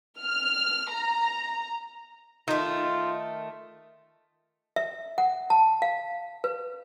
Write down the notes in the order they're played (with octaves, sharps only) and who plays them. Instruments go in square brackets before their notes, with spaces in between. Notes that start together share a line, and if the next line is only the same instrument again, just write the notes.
[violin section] F6
A#5
[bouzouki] D#3 A3 [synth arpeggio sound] D#4 [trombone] F4
[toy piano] E5
F#5
A5
F5
B4